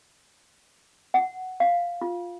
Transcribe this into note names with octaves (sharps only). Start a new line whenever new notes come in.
F#5
F5
F4